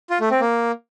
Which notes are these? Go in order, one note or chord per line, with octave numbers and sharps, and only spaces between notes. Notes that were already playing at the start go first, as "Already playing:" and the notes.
F4
A3
C4
A#3